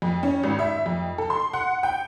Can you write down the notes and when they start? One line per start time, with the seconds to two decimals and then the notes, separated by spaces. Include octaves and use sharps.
0.02 F2
0.23 C#4
0.43 G#1
0.59 E5
0.86 F2
1.18 A4
1.30 C6
1.53 F#5
1.83 G5